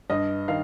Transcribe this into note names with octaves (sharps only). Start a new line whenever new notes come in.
G2 D#5
D#3 F5